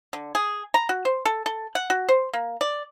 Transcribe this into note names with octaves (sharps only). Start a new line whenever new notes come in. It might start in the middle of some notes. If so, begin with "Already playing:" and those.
D3
G#4
A#5
F#4
C5
A4
A4
F#5
F#4
C5
A#3
D5